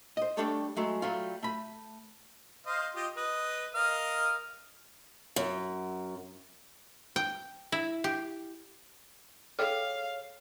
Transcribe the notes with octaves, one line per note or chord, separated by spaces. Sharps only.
C5 D#5
G3 A3 D4 G4 A4 C#5
F#3 G#3 A3
F#3 G3 A3 F4
A3 B5
C5 D#5 F5
F4 G4 D#5
B4 D#5
A#4 D#5 F5
F#2
G5
E4
G4
G#4 A4 C#5 F5 G5 F6